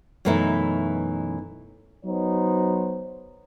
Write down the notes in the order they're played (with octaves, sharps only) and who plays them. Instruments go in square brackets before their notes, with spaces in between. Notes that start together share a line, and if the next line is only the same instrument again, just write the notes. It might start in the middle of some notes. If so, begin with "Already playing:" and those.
[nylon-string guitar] F#2 B2 E3 A3 D#4 E4
[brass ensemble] F#3 B3 D#4 C5 C#5